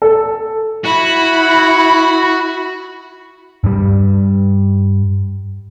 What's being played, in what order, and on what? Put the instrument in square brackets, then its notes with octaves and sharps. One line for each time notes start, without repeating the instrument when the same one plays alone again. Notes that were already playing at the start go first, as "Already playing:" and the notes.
[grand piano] A4
[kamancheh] E4 B5 [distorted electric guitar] F#4
[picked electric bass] G2 G3